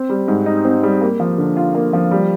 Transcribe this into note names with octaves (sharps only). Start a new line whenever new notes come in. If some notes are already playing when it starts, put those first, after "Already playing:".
Already playing: C4
G3
G#2
D#4
C4
G3
A#3
F3
D3
F4
A#3
F3
G3